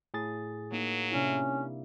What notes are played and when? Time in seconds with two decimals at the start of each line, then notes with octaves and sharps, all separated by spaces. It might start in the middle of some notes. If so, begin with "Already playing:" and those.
0.14 A2 G#4 A6
0.72 F#3 A#3 D#4
1.12 C3 C#4 D4 E4